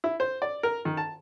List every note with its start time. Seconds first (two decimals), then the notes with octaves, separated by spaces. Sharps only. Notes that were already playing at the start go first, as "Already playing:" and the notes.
0.04 E4
0.20 C5
0.42 D5
0.63 A#4
0.85 D#3
0.97 A5